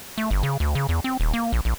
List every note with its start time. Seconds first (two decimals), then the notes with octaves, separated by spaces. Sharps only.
0.18 A3
0.31 G1
0.43 C#3
0.60 D2
0.75 C#3
0.89 E2
1.04 C4
1.20 D#1
1.33 A#3
1.52 A#1
1.65 A#1